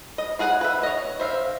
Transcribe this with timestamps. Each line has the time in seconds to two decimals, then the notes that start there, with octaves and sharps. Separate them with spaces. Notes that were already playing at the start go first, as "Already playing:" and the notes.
0.18 D#5
0.39 F4 G#4 F#5 G#5
0.61 B4 E5
0.83 C#5 D#5
1.20 C5 E5 F5